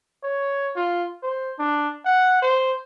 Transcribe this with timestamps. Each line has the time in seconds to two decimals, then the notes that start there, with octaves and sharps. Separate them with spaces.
0.23 C#5
0.76 F4
1.23 C5
1.59 D4
2.05 F#5
2.42 C5